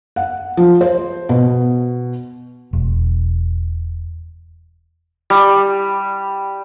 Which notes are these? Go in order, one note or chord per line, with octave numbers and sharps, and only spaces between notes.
F#5
F3
C5
B2
E1
G3